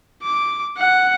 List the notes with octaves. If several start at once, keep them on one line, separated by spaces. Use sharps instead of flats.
D6
F#5